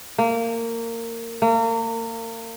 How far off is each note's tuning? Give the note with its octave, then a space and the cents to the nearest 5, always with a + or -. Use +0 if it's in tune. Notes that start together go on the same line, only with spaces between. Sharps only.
A#3 -20
A#3 -35